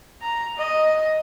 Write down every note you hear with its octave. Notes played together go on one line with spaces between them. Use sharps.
A#5
D#5